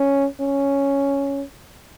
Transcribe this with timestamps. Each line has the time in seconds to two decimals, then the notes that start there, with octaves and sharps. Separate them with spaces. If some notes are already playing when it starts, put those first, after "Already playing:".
Already playing: C#4
0.40 C#4